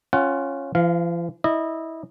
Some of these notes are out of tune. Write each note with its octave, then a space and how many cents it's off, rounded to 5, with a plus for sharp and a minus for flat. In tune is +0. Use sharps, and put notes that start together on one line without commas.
C#4 -10 F4 +0 F#5 +20
F3 -45 F5 +0
E4 -25 D#5 -20